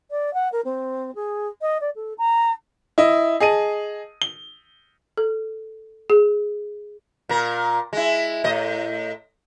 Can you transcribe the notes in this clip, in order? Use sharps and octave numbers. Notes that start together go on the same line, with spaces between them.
D5
F#5
A#4
C4
G#4
D#5
D5
A4
A#5
E4 D#5
G#4 D#5 A5 D#7
G7
A4
G#4
A#2 A#4
G#3 E4
A2 D#5